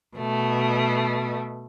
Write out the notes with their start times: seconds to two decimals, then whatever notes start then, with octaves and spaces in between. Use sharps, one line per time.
0.16 B2 A3